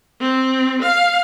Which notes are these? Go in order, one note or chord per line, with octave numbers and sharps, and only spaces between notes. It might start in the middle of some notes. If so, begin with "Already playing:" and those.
C4
F5